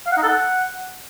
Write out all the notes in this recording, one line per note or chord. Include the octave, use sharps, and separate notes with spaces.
F5
F#5
D#4
A4
F#5